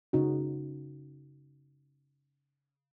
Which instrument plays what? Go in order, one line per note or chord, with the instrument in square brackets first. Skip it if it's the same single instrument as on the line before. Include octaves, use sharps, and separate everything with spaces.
[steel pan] C#3 D#4 F#4